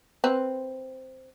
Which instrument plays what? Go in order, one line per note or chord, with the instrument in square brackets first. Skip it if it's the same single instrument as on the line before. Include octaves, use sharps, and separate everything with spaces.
[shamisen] C4 B4